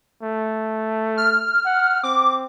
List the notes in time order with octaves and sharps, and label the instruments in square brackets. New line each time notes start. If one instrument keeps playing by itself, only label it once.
[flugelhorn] A3
[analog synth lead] F6
[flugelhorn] F#5
[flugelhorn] C4 [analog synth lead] D6